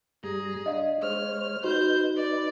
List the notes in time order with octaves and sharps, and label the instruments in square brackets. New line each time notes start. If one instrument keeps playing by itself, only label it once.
[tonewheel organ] G2 G3 A#5 [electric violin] G#4
[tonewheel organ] D4 [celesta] D#5 F5
[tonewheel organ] G#3 C5 C#5 [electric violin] F6
[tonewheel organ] D#4 B4 [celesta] F#4 [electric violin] C5 G6
[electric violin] D5